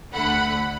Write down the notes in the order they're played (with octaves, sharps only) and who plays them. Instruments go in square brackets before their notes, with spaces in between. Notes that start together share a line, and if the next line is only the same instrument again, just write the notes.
[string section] D2 D3 A3 F#5 B5